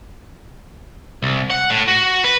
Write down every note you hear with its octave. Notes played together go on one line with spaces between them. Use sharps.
C2
F#5
A2
F#4
B4